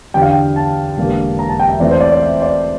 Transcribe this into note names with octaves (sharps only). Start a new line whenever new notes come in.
E2 D3 G3 G5
F5
G5
A5
E1 E2 D3 G3 A#3
A#5
A5
G5
E5
E2 E3 A3 C4 D5
C5
D5
D5
E5
D5